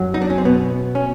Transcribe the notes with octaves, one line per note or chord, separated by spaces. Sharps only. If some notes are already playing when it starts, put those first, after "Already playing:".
Already playing: F#2 F#3
D#4
D4
C#4
C4
B2 B3
C#4